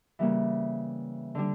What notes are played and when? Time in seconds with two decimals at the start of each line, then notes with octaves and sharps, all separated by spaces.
0.19 C#3 E3 G3 A#3
1.35 D3 G3 D4